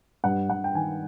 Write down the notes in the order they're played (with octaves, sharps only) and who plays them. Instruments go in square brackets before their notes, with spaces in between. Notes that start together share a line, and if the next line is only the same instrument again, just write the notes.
[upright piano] G2 F#5
G2 F#5
G5
D#3 G#5